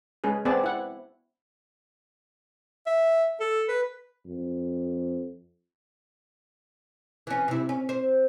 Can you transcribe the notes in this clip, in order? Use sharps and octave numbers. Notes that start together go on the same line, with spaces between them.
G#3 C#4 G#4 B4
B3 C4 G#4 B4 D5 A5
E4 F#5
E5
A4
B4
F2
E3 C#4
C3 E4
C#4
C5